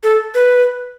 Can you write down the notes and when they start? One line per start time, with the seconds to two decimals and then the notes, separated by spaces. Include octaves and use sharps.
0.03 A4
0.35 B4